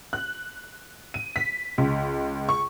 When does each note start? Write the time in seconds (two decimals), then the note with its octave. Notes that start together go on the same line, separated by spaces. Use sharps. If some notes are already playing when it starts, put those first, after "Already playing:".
0.13 F#6
1.14 D#7
1.36 B6
1.78 C#2
2.49 C#6